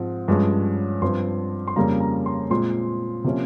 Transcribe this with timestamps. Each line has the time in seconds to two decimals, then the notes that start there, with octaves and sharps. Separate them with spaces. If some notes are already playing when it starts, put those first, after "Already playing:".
Already playing: G#2 F3 C4
0.28 G2 F3 G#3 C#4
1.02 G2 F3 C4 C6
1.68 C6
1.76 F2 C#3 G3 A#3 C#4 A#5
2.00 A#5
2.26 C6
2.50 A#2 G#3 C4 C6
3.24 C3 F3 A#3 C#4